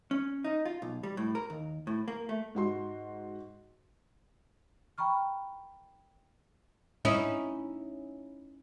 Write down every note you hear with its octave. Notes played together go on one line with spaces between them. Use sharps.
C#4
D#4
F4
B1
G3
A2
A#4
D#2
A2
A#3
A3
G#2 F#4 C6
G5 A#5 B5 C#6 F6
C#4 D#4 E4